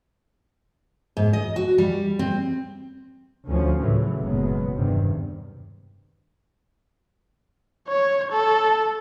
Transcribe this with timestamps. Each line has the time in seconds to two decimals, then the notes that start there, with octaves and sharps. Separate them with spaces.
1.17 G#2
1.33 D#5
1.56 F#4
1.78 G3
2.19 C4
3.47 D2 F3 C#4
3.78 A2 C#3 E3 F#3
4.20 F#1 E2 B2 F#3 G#3 B3
4.75 E2 G2 C3 D#3
7.88 C#5
8.32 A4